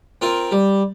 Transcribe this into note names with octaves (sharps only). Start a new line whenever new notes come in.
C4 F4 A#4
G3